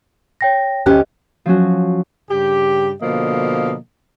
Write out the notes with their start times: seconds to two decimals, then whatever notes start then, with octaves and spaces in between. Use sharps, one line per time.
0.41 C#5 G5 A#6
0.86 D2 C#4 G4 D#5 F#6
1.46 F3 F#3 C#4 F#4
2.30 G2 C#3 G4
3.02 B2 D3 F3 A#3 D#5